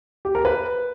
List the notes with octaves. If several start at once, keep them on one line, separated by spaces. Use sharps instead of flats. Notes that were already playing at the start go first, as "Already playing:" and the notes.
G4
A#4
B4